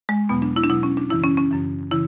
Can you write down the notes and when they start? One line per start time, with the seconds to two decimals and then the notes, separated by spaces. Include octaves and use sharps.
0.09 G#3
0.29 E2 B2 F#3 B3
0.42 D4
0.56 E4
0.64 D4
0.70 E2 B2 F#3 E4
0.83 C#4
0.97 D4
1.10 F#2 C#3 E3 E4
1.23 C#4
1.37 C#4
1.51 F#2 C#3 E3
1.91 C#3 E3 E4